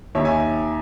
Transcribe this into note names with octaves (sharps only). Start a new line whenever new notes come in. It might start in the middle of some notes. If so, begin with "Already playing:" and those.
D#2 D#3 C#5 E5
E5 G#5